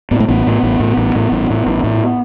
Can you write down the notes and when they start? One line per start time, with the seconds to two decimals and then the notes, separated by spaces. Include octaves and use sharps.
0.11 A2 B3
0.20 A3
0.28 A1 B3
0.47 A2
0.63 A1
0.80 A2
0.97 A1
1.15 A2
1.32 A1
1.50 A2
1.67 A1
1.84 A2